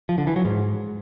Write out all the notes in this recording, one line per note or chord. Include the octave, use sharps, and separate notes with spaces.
F3
D3
E3
F#3
G#2